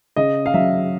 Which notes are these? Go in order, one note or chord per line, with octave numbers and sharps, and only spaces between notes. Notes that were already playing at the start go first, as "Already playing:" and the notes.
C#3 D#5
F5
F#3 E5